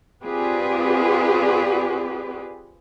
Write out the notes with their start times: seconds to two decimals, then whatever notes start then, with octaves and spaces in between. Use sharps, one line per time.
0.23 C4 F4 G4 G#4 B4 D5